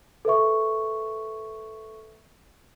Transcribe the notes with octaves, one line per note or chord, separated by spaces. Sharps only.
A4 B4 E5 C#6